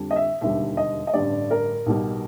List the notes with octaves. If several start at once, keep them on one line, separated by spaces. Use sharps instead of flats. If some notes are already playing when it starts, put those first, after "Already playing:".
Already playing: F2 D3 G3
D#5
E5
E1 D#2 D3 G3 E5
D#5
D#5
A1 G2 D3 G3 D5
A#4
B1 B2 G3